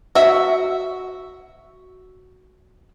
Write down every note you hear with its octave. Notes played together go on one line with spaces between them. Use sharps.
F#4 E5